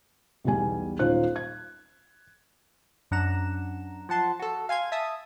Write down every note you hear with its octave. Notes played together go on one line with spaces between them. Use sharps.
B1 E2 B2 G3 G#5
D#1 C#4 D#4 F4 C5 F#6
G#6
F#2 D4 F#5 A#5 E7
F3 F#5 A5 C6
F#4 A4
F5 G#5 C6 G#6
E5 A5 D#6 E6